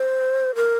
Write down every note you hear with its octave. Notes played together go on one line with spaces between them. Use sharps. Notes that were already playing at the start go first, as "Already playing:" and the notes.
Already playing: C5
A#4